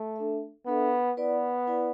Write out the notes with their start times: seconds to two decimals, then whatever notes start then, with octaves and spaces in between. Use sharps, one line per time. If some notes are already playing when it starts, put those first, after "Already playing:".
Already playing: A3
0.16 D4 A4 E5
0.66 B3 D4 A4 E5
1.17 B3 E4 B4 D5
1.67 E4 B4 D5